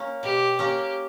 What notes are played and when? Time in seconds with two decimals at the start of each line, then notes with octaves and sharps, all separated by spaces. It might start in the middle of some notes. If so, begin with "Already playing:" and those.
Already playing: A#3 C#4
0.23 B2 G4
0.59 A#3 C#4 G4